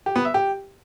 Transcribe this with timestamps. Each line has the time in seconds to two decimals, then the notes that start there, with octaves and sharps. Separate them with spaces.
0.06 G4
0.16 B3
0.25 E5
0.34 G4